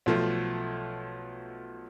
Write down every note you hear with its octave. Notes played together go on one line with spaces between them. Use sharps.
B1 F3 A3